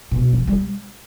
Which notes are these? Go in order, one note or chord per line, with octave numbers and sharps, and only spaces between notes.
B2
F3
G3